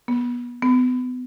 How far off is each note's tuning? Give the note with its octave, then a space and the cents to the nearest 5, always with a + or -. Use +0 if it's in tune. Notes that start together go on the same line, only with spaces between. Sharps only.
B3 -25
B3 +30